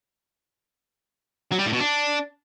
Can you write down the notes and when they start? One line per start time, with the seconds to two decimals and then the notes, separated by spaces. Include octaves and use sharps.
1.52 F#3
1.59 G3
1.66 A2
1.73 B2
1.80 D4